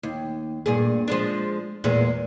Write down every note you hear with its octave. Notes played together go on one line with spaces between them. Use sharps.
D#2
G2 A#2 G#4
F3 G#3 D4
E2 A#2 G#3